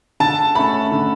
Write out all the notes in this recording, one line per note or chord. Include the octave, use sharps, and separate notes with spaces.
D3 A5
A3 C#4 B5
D3